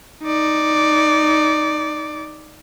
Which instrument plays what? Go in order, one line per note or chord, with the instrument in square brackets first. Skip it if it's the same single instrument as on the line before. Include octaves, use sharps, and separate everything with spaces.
[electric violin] D#4 D5